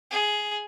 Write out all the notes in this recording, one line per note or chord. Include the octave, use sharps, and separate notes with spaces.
G#4